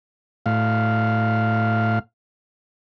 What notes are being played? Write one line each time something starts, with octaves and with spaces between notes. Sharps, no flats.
A2 F5